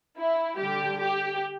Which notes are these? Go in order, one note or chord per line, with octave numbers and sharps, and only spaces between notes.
E4
D3 G3 G4
G4